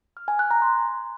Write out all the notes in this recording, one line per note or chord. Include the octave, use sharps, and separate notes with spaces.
F6
G#5
F#6
A#5
C6